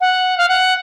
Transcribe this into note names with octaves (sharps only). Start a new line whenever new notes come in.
F#5
F5
F#5